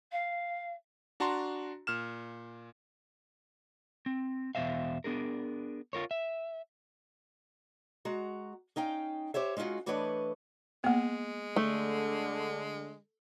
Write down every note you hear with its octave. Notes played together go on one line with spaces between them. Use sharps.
F5
D4 F#4 A5 A#5 C6
A#2 F6 E7
C4
E2 B2 G3 C5 E5 F5
B3 D4 G#4 A#4
F4 A#4 C#5
E5
G#3 F#4 A#5
C#4 D#4 F5 G5
G4 C5 C#5 E5
G#3 C#4 D#4 F4 F#4
E3 A3 D4 B4 C#5 D#5
G#3 A#3 B3
D3 A3